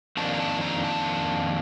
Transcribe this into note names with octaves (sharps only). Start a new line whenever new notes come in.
F2 D#3 A#3 D4 A5
A#5
A5
A#5
A5